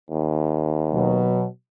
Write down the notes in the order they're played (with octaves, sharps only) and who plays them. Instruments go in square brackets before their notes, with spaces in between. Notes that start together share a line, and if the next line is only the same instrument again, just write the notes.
[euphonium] D#2
[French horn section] B2 F#3